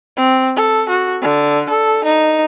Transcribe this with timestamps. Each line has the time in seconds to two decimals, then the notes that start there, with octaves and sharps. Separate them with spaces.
0.17 C4
0.56 A4
0.89 F#4
1.22 D3
1.70 A4
2.04 D#4